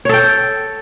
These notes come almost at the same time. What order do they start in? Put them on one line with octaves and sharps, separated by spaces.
C#5 A4 G5